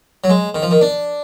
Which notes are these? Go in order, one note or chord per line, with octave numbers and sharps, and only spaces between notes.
F#3
G#3
D#3
F3
D#3
D4